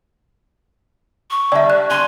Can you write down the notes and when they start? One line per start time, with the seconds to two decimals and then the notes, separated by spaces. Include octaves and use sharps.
1.31 C#6
1.52 D3 G3 D5 E5
1.70 F#6
1.90 G#5 C6